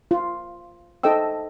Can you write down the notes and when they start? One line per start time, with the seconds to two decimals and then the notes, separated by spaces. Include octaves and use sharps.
0.11 F4
1.03 D#4 A4 C5 D#5 G5 E6